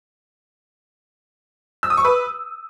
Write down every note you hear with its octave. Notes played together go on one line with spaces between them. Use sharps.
E6
D#6
C#6
B4